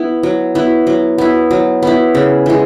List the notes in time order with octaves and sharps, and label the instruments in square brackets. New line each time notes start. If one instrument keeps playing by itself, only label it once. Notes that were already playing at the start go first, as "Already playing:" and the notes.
Already playing: [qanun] B3 E4
F#3
B3 E4
F#3
B3 E4
F#3
B3 E4
C#3
E3 G#3